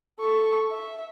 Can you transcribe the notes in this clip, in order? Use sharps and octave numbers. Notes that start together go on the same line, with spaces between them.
A4 C#6
E5